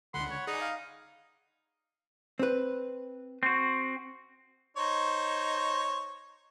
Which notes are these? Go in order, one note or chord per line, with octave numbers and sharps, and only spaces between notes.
C#2 D3 F#5 B5 C6
C#5
D#4 G#4 D5
F5
C4 B4
C4 F#4
D#4 C5 C#5